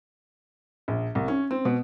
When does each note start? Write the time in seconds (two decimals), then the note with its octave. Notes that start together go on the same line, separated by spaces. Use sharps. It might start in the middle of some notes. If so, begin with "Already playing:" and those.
0.88 A#1
1.15 C2
1.28 C#4
1.51 C4
1.65 B2